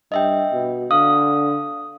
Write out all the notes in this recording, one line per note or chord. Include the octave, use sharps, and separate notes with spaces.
G2 D#5 E5 G5
B2
D3 F5 D#6